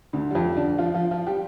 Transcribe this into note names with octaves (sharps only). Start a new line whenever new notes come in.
D2 D3
G3
F2 F3
D3 D4
F3 F4
F3 F4
F3 F4
G3 G4